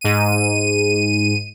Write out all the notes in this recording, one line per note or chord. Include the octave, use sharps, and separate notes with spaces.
G#2 D#7